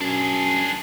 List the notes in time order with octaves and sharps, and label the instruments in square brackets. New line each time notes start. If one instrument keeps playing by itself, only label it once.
[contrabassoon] F#2 [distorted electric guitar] D4 G#4